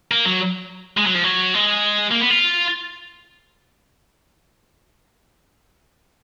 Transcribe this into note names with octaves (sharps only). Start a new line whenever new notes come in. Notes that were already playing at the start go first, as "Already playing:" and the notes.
A#3
F#3
G#3
F#3
F3
F#3
G#3
A#3
B3
F4